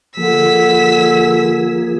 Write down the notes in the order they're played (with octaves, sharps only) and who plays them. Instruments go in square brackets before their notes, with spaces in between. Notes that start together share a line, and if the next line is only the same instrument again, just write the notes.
[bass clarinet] D3 [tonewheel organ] F3 A#3 G#4 [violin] E6 B6